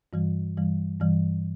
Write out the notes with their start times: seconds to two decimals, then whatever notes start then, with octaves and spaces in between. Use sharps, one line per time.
0.13 G2 E3 G3
0.57 G2 E3 G3
1.00 G2 E3 G3